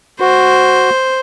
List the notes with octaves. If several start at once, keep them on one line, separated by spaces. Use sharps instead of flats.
F#4 C5